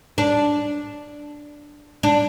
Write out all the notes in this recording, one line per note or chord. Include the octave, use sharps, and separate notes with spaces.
D4
D4